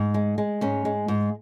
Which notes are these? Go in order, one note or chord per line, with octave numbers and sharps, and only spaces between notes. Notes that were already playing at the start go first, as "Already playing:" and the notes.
Already playing: G#2
G#3
G#3
G#2 C#4
G#3
G#2